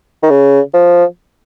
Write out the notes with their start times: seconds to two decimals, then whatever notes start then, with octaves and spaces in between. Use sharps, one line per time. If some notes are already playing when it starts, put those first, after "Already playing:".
0.23 D#3
0.30 C#3
0.74 F3